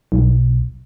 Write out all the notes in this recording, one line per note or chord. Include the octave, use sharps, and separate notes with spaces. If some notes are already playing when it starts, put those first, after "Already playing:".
B1